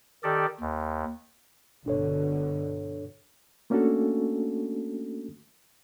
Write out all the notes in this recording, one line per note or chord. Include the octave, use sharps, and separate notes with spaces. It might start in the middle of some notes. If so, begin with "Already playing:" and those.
D#3 G4 A4 D5
D#2
G1 B2 D3 D4 A4 C#5
A3 A#3 C#4 D4 F#4 A4